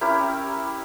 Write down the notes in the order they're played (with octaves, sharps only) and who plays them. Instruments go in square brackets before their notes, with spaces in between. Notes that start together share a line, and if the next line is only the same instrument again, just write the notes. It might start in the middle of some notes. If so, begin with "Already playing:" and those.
[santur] C#4 E4 G4 A#4